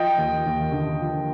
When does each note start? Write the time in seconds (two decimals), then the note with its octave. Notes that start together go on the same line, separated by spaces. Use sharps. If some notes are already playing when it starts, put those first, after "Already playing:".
Already playing: F3 D#5 G5
0.18 D#2
0.46 D#2
0.72 D3
1.00 F3